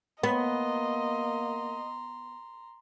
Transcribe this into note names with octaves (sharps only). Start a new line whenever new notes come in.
A#3 B3 D#5 A#5 C6